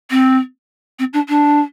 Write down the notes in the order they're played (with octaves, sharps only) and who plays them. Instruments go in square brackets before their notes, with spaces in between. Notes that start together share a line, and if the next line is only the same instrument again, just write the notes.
[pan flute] C4
C4
D4
D4